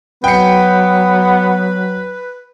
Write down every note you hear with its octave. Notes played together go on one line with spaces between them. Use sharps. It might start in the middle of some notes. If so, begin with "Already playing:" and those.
F#3 B3 B4 G5 C#7